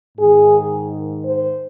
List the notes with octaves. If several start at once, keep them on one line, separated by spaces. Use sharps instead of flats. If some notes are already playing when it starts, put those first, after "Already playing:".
G#2 D#3 G#4
C5